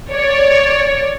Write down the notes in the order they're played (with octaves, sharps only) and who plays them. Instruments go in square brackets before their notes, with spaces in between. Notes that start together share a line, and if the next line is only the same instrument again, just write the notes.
[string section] C#5 D5